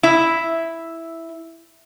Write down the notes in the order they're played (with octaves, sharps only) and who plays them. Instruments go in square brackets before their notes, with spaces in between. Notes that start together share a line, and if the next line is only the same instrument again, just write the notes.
[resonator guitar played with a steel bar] E4 E5